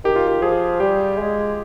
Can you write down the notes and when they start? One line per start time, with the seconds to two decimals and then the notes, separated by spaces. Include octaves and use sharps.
0.04 D#3 G4
0.16 F4
0.28 G4
0.42 F3 G#4
0.80 G3 G4
1.18 G#3